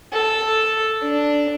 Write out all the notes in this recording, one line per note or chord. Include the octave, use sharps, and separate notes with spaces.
A4
D4